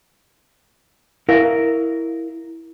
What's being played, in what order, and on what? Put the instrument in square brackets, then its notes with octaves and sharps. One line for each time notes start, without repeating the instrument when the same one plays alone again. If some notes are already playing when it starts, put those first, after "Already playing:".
[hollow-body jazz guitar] E4 A#4 F5